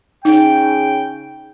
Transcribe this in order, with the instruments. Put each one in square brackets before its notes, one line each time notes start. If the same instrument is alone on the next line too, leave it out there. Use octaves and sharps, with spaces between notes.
[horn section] C#3 G5 [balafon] D#4